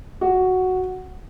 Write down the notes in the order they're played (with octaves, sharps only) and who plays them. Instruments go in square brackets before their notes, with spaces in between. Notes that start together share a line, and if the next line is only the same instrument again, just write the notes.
[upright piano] F#4